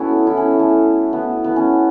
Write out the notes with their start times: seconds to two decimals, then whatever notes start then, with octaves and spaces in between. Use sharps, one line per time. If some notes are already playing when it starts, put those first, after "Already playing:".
Already playing: A3 B3 C#4 E4 F#4
0.27 E4
0.37 C#4
0.59 A3
1.13 B3
1.44 B3
1.56 C#4